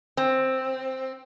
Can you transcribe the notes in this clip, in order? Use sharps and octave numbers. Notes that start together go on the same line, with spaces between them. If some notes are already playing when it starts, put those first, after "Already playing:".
C4